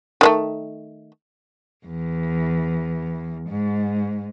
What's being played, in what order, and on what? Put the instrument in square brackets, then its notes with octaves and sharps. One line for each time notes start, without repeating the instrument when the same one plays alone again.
[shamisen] D#3 G#3 A3
[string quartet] E2
G#2